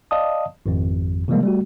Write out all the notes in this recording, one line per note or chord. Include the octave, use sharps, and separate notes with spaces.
D5 D#5 F5 A5 D#6
G#1 F2
C3 E3 F3 G3 G#3 A#3
G3 A3 F#4